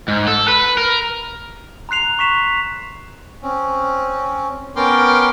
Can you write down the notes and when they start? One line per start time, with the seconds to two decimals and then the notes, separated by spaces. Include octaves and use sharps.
0.08 G#2
0.28 A4
0.48 B4
0.77 A#4
1.89 A#5 C6 F#6 C7 F7
2.19 C#6 B6 E7
3.42 C4 C#4
4.76 B3 C#4 A#4 G5 C6 D6